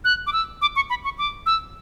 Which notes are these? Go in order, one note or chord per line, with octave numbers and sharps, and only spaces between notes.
F#6
D6
E6
D6
C#6
B5
C#6
D6
E6